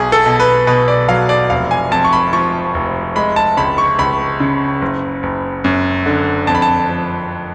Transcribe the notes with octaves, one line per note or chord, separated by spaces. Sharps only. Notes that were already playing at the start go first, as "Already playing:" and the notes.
Already playing: B1 G#4
A4
B2
B4
B2 B4
D5
F#3 F5
D5
F1 F5
G#5
F2 A5
C#6
B5
F3 C#6
F1
G#3 B5
A5
C#2 B5
C#6
C#2 B5
C#3
F#1
F#1
F#2
D3
F2 A5
B5
A5
F3